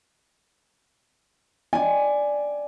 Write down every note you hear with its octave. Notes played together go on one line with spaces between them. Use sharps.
D5 G#5